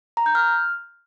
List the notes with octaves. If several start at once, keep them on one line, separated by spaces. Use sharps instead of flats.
A#5
G6
F6